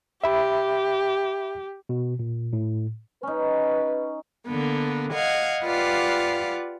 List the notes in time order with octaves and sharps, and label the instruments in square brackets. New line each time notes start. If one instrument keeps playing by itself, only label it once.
[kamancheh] G4 [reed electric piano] E5 B5
[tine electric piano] B2
A#2
A2
[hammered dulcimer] C#4 D#4 [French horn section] B4
[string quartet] D3 A#3 B3
D#5 F5 F#5 G#6
F4 G4 B4 D5 F5 F#5